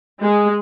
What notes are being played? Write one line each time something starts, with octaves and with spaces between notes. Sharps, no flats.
G#3